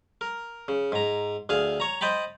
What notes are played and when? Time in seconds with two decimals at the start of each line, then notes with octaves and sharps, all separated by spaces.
0.21 A#4
0.68 C#3
0.92 G#2 A#5
1.49 D2 G#4 F5
1.80 C#5 A#5
2.01 C5 D#5 G5 A5 B5